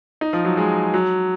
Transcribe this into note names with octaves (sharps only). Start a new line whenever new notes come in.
D#4
F3
F#3
G#3
F#3